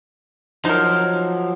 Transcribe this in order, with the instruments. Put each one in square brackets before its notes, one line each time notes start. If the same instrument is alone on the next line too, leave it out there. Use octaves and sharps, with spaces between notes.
[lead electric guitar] F3 F#3 [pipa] D#4 A#4